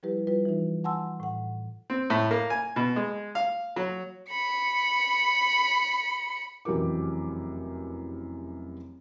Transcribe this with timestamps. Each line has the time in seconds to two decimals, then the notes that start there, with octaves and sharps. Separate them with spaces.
0.03 F3 G3 E4 G4 B4
0.27 G3 F4 B4
0.45 E3 D#4
0.84 F#5 G#5 A5 C6 E6
1.20 A2 F#5
1.90 C4
2.10 A2
2.31 A#3
2.50 G#5
2.76 B2
2.96 G#3
3.35 F5
3.76 F#3
4.29 B5 C#7
6.65 F1 F#2 E3 G4 A#4 D6